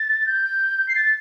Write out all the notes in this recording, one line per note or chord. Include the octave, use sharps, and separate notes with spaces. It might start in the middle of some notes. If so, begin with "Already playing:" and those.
Already playing: A6
G6
C7
A6